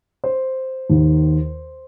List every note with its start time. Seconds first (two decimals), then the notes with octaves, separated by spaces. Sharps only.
0.24 C5
0.90 D#2 D#3